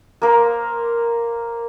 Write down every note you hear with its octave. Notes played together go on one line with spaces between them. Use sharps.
A#3 A#4 C5